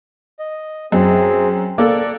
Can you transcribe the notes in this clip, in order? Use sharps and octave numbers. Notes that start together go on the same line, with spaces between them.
D#5
F#2 C4 G#4
A#3 A4 D5 F#6